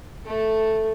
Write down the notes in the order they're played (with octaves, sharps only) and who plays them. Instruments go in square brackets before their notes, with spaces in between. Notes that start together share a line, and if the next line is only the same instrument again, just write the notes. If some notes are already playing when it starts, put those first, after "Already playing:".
[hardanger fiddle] A3 A4